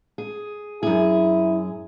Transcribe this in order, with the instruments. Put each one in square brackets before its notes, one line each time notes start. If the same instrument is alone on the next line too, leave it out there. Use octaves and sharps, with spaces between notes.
[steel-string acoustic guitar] G#4
[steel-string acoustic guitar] F#2 G#4 [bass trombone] E4